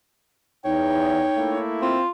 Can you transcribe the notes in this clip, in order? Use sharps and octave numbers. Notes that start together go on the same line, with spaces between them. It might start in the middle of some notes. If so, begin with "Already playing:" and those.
E2 D#4 C#5 G5
A3 A#3 E4
C4 F4